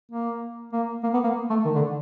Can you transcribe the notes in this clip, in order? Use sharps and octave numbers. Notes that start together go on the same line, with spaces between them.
A#3
A#3
A#3
B3
A#3
A3
D#3
D3